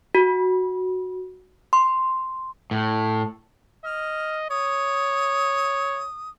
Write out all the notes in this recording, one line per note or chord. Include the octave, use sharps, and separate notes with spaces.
F#4
C6
A2
D#5 F6
C#5 D#6